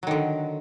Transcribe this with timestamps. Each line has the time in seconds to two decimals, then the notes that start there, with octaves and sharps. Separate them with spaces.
0.03 F#3
0.07 D#3
0.11 D3